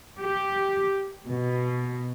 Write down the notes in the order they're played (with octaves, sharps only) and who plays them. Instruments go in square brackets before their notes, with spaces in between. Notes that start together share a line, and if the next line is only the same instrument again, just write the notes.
[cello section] G4
B2